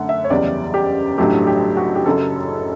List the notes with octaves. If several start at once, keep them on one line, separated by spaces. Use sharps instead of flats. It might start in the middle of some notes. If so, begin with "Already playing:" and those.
Already playing: F#2 D3 A3 F#5
E5
C#5
F#1 E2 C#3 G3 D5
G4
A1 G2 F#3 A3 G4
G4
F#4
G4
F#1 F#2 C#3 F#3 A4